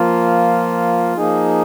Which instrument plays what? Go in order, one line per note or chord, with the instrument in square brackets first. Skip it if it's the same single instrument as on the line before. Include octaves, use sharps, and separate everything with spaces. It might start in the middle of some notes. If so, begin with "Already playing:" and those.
Already playing: [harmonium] F3 A#3 F4
F3 A#3 D#4 G#4